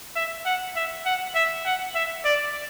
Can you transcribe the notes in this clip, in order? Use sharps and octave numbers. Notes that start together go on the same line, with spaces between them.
E5
F#5
E5
F#5
E5
F#5
E5
D5